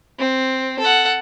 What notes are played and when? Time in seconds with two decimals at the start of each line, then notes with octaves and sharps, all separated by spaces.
0.19 C4
0.80 A4 F#5